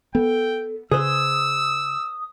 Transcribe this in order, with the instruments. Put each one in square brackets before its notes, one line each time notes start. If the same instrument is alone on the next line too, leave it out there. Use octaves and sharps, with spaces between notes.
[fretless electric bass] B3 [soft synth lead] A4 [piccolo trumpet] G5
[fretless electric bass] C#3 [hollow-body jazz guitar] G#4 B4 C5 [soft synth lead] D#6 [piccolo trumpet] E6